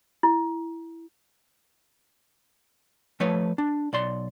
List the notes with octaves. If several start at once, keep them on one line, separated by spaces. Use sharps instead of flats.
E4
F3 A3 B4 C#5
D4
B1 D5 C6